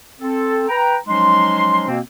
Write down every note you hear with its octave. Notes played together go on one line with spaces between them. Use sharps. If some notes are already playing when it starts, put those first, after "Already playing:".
C4 A4
B4 G5 A#5
F3 F#3 G#3 C#4 D#4 C6
B2 A#3 C4